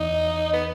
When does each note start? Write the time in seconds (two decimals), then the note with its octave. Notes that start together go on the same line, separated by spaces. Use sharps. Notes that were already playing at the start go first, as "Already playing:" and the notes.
Already playing: E2 D#4
0.53 B3